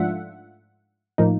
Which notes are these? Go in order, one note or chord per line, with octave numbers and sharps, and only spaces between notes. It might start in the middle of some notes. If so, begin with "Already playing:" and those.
Already playing: G#2 F3 A3 D4 F4 E5 F#5
A2 F3 A#3 D#4